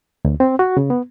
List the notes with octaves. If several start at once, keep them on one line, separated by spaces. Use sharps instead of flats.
D2
C4
F#4
C#3
B3